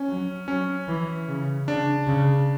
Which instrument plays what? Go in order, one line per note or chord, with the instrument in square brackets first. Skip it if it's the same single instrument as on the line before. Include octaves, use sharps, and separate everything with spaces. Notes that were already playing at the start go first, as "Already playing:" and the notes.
Already playing: [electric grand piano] C#4
[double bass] F#3
[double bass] F#3 [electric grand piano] C#4
[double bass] E3
C#3
[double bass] C#3 [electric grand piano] D4
[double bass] C#3